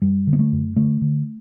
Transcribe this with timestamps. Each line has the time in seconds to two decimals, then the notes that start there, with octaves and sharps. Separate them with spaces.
0.02 F#2 G3
0.27 D3
0.33 B3
0.39 A3
0.52 F#2
0.76 D3 A3
1.01 D3